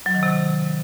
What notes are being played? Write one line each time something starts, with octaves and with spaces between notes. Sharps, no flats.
F#3
D#3
C3